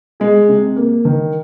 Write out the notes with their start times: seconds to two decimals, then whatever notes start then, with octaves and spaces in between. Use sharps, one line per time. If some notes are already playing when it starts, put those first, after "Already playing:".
0.20 G#3 G#4
0.49 C3
0.76 A#3
1.05 D#3